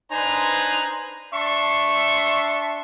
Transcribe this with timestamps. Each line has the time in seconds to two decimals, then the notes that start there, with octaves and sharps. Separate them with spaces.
0.11 D4 D#4 B4 C5 G#5 A#5
1.34 D4 E5 A5 C6 C#6